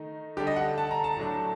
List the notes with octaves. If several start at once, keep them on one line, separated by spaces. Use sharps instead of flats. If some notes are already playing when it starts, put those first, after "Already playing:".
Already playing: D#3 A3 D#4
D3 G3 D4 G4
D#5
F#5
A5
A#5
A5
A2 F#3 A3 D4